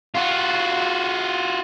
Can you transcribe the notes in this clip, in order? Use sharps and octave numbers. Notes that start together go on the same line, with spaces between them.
F4 F#4